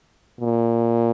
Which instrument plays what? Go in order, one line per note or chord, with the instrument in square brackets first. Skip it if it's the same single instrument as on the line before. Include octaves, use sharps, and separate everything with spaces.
[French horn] A#2